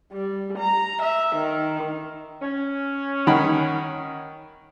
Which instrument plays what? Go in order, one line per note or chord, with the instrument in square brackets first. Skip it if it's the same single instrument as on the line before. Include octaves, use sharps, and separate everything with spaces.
[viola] G3
A#5
E5
D#3
[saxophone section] C#4
[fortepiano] D#3 F#5 B5